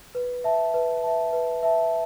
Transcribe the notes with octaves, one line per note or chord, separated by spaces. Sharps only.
B4
E5 A5
B4
E5 A5
B4
E5 A5